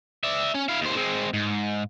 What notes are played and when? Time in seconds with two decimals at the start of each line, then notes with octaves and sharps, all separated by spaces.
0.23 D5 E5
0.54 C#4
0.68 E4 F5
0.81 D#2 C5
0.96 G#3 C4
1.34 G#2